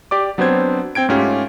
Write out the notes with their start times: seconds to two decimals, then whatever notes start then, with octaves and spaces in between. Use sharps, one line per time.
0.11 G4 D5 D6
0.38 F#3 B3 C4 D4 C5 G#6
0.95 C4 G5 G#6 D7
1.09 G#2 A3 C#4 F4 G4